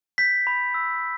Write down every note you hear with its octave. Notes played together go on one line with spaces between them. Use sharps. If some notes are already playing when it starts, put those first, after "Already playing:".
G6 B6
B5
E6